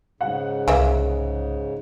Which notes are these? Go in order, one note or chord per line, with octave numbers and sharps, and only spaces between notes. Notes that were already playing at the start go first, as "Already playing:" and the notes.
G#2 C#3 F#5
C2 E3 A#3 E5